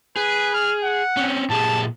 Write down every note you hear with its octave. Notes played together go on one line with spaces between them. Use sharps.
G#4 B4
F6
F#5
C4 C#4
A#2 G4 G#4 A5